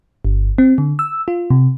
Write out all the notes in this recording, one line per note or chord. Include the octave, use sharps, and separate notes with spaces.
G1
C4
D3
E6
F4
C3